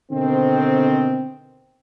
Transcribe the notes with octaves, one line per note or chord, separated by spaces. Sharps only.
B2 D3 D#3 C4